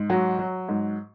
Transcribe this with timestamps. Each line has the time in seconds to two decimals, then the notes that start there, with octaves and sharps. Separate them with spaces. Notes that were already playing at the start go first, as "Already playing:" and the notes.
Already playing: G#2
0.10 F#3 F#4
0.39 F#3
0.69 G#2